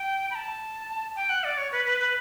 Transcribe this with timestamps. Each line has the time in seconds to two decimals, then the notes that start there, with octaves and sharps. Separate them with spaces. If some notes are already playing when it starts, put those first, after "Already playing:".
Already playing: G5
0.31 B5
0.35 A5
1.16 G5
1.29 F#5
1.44 D5
1.57 C#5
1.72 B4
1.86 B4
2.00 B4